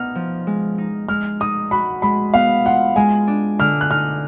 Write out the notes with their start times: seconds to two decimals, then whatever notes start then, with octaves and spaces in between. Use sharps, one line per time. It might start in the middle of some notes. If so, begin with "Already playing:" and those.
Already playing: B3 D#4 F6
0.15 F3
0.47 G#3
0.78 D#4
1.09 G#3 F6
1.40 D#4 D#6
1.71 F#4 B5
2.02 G#3 B5
2.34 B3 F5
2.65 F4 F#5
2.96 G#3 G#5
3.27 D4
3.59 D3 F6
3.81 F#6
3.90 D#4 F6